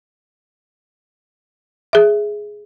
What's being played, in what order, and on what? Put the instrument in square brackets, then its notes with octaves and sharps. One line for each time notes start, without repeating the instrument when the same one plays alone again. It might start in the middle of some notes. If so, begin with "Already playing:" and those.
[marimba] G#4 E5